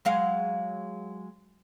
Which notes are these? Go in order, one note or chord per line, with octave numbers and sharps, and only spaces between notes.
F#3 G#3 F5